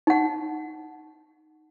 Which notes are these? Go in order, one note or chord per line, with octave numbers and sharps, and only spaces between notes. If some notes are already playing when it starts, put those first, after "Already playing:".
D#4 F#5